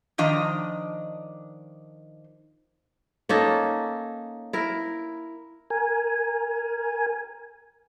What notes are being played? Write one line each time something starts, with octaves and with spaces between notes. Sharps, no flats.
D#3 F3 D4 D#5 A#5
A#3 C#4 D#4 A4
E4 A#4
A#4 G#5